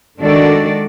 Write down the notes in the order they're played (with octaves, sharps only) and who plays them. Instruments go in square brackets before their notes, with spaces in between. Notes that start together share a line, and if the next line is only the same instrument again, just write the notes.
[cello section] D#3 G#3 D4 F#4 A4 D5